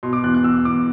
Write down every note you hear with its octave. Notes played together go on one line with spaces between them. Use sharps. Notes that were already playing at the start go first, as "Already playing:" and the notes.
B2 C6
D6
E2 F#6
F#6
E2 E6
E2 D6